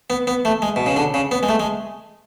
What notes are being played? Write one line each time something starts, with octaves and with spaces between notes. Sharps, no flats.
B3
B3
A3
G#3
B2
C#3
D3
C#3
B3
G#3
A3
G#3